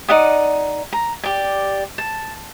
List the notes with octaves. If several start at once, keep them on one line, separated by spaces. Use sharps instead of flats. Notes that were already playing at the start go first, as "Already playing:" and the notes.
D#4 D5 F#5 D#6
A#5
G4 D5
A5